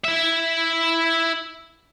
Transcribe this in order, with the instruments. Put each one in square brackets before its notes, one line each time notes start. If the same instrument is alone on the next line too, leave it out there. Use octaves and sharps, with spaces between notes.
[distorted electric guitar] E4 E5